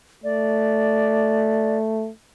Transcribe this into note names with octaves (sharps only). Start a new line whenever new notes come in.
A3 D5